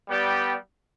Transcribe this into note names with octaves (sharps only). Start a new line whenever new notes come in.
G3 B3 G4 D5 G5